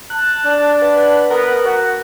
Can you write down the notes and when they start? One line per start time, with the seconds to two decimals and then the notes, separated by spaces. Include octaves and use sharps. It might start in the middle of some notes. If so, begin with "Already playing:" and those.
0.10 A5 F#6
0.45 D4
0.82 B4 F#5
1.30 B3 A#4
1.63 F#4